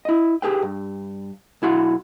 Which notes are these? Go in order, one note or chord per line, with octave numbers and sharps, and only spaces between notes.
E4 D#5
G4 G#4 B4 G5
G2
B1 E4 F#4 C6